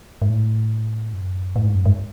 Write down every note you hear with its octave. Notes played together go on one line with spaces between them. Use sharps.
G#2
A2
F#2
A2
G#2
F#2
G#2